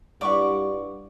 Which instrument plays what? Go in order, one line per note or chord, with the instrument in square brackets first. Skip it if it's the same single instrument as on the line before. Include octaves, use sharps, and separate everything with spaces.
[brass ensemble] G2 [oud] E4 F4 D5 [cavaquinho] F#5 C#6 D6